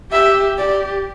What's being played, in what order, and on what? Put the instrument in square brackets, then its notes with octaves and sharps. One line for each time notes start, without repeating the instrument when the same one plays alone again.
[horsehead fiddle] G4 [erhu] E5
[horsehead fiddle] G4 [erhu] D5